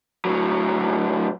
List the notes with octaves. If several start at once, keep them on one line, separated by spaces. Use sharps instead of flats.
A2 F#3